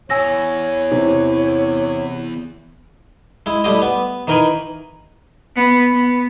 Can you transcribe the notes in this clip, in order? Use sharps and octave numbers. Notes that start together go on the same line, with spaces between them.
E2 C#5 G#5 E6 A#6
C3 E3
G#3 E4
G3 A3 E4 G4 D#5
B3
D#3 E3 A#4 G5 G#5 B5
B3
B3